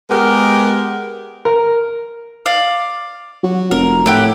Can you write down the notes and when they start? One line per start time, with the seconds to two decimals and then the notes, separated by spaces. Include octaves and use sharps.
0.10 G#3 B3 G4 A#4
1.45 A#4
2.46 D5 F5
3.43 F#3
3.71 F1 A#4
4.06 A2 E4 G4 F#5